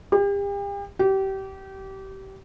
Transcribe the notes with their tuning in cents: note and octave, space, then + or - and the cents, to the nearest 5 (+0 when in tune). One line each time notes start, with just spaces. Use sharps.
G4 +40
G4 -25